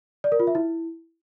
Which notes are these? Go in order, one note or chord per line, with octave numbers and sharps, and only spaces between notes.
D5
A#4
F4
E5
E4